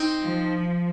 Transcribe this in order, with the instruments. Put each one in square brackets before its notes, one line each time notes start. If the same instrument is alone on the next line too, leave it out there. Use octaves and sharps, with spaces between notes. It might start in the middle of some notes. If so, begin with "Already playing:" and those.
Already playing: [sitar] C4 D#4
[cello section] F3